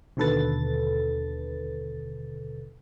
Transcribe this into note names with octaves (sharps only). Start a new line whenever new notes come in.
D#2 B2 D3 A4 B4 A6